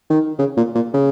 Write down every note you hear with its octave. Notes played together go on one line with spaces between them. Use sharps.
D#3
C#3
A#2
A#2
C#3